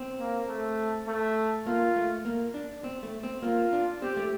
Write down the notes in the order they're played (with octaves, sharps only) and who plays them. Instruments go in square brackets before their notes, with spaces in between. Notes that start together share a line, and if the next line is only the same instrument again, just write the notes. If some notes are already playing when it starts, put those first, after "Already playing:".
Already playing: [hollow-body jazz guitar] C4
[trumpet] A#3
A3
A3
[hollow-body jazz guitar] A#3 [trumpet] F4
[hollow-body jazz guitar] A3
A#3
D4
C4
A3
C4
[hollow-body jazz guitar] A#3 [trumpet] F4
[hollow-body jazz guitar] D4
[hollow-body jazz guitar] C4 [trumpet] G4
[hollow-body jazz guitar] A3